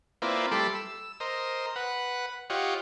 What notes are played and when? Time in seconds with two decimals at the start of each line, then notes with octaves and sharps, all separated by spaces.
0.22 A#3 C4 E4 F4 B4 D5
0.51 G3 A3 A4 B5 C6 D6
0.75 E6
1.20 A#4 C5 D#5
1.76 B4 F#5
2.50 F4 G4 C#5 D#5 F#5